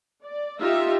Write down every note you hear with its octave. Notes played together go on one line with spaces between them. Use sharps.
D5
D#4 F4 G4 E5